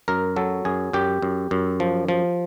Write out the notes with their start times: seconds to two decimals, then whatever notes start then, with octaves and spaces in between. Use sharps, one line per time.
0.08 F#2 A#4
0.36 F#3 A4
0.65 F#2 G#4
0.93 F#2 G4
1.22 F#2
1.51 F#2
1.80 F3
2.09 F3